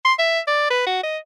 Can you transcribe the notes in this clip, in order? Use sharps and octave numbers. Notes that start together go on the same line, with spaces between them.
C6
E5
D5
B4
F#4
D#5